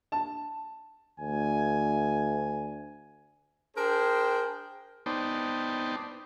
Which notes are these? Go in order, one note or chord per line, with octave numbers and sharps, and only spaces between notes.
A5
D2 G#5
D4 G#4 A#4 C5 G5
B3 D#4 C5 D5 G5 A5